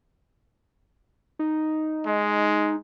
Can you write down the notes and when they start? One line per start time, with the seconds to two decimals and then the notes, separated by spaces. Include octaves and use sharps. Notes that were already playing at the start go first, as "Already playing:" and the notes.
1.39 D#4
2.06 G#3